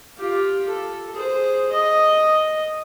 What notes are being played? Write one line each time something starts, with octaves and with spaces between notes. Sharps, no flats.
F4 G4
A4
G#4 C5
D#5